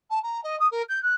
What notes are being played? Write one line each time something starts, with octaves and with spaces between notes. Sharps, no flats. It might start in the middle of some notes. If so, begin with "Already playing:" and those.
A5
A#5
D#5
D#6
A#4
G6
F#6